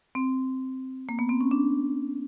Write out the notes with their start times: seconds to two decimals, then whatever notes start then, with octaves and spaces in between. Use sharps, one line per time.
0.15 C4
1.09 A#3
1.19 B3
1.29 C4
1.41 C#4
1.51 D4